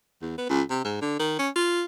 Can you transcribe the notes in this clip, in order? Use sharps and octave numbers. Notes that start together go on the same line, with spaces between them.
E2
B3
C#2
C3
G#2
D3
D#3
C#4
F4